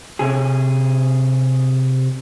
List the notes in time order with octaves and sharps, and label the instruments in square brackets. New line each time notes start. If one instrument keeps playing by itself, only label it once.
[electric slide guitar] C3 G#4